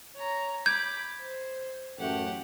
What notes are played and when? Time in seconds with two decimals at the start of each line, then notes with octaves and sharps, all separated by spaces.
0.16 C#5 A#5
0.66 B5 D6 G6 G#6
1.20 C5
1.98 A1 F#2 A3 G4 F#5